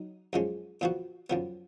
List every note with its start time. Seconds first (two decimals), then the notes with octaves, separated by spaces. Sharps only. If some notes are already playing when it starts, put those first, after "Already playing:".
Already playing: F#3 D#4
0.33 F#2 F3 G#3 C#4
0.81 A#2 F3 B3 F#4
1.30 F#2 F3 B3